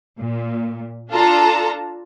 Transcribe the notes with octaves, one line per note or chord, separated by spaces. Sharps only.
A#2
D4 F4 A4 A5 A#5